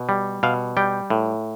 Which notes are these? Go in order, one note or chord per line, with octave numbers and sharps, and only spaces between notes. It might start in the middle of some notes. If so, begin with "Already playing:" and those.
Already playing: B2
G3
B2 F5
G3 G5
A2